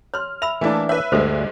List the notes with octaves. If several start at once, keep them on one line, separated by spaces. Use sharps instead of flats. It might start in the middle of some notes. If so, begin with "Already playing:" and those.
C#5 C6 F6
E5 B5 E6 F7
E3 A3 A#3 D4 E4 A5
B4 C#5 E5
D2 G2 G#3 G4 A4 C5 E5